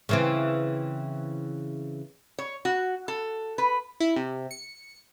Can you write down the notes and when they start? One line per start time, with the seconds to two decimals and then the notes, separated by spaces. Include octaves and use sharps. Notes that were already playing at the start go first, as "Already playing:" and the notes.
0.09 C#3 E3 C4
2.39 C#5
2.65 F#4
3.08 A4
3.58 B4
4.00 E4
4.16 C3
4.51 C#7